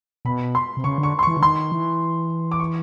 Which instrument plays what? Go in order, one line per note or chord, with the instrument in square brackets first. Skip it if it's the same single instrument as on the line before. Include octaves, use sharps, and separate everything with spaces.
[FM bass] B2 [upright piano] B5
[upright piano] C6
[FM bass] C3
[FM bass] C#3 [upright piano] C#6
[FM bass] D3
[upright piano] C#6
C6
[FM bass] E3 [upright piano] C#6
[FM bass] D3
[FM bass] D#3 [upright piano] C6
[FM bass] E3
[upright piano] D6
C#6